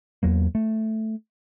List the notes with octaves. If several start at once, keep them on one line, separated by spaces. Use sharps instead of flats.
E2 F#3 A#3
A3